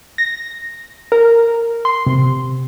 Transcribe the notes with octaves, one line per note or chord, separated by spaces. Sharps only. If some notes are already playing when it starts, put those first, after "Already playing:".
A#6
A#4
C6
C3